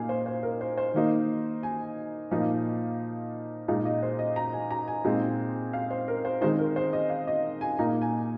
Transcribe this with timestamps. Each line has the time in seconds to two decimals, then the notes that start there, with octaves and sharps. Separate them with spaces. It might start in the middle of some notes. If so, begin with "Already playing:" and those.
Already playing: A#2 A#3 D#4 F5 G#5
0.09 C5
0.26 C5
0.43 A#4
0.61 C5
0.78 C5
0.94 D#3 A#3 D#4
1.63 G#5
2.31 A#2 F3 A#3 D#4 F5
3.68 A#2 G#3 D#4 F5
3.85 D#5
4.03 C5
4.19 D#5
4.36 A#5
4.53 G#5
4.71 A#5
4.88 G#5
5.04 A#2 G#3 C4 D#4
5.73 F5
5.91 C5
6.08 A#4
6.25 C5
6.41 D#3 G#3 C4 D#4 C5
6.59 A#4
6.76 C5
6.93 D#5
7.10 F5
7.27 D#5
7.61 G#5
7.79 A#2 A#3 D#4 A#5
8.02 G#5